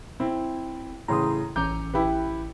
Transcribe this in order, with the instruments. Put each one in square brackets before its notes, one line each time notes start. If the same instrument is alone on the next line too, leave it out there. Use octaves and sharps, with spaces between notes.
[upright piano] C4 E4
[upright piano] A2 C#3 E3 [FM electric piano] A#5 C6 D#6
[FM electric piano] A1 E3 C#4 [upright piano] A#5 D6 G6
[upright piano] E4 G4 B4